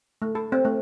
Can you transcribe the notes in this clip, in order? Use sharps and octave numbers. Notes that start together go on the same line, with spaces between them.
A3
A4
C4
A3